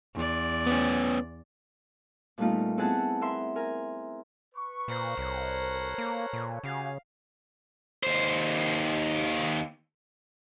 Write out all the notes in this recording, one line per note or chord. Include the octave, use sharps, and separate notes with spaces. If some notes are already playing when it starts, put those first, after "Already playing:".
E2 D5
B3 C#4
A#2 G3 A3 B3 D#4 F4
B3 C4 E4 G#4 F#5 A5
A#4 E5 C6
A#4 G#5
B4 C#6
A#2 A#4 C5 F#5
C2 A4 B4 C#5
A#3
A#2
C#3 F#4 G4 F5 G#5
D#2 C5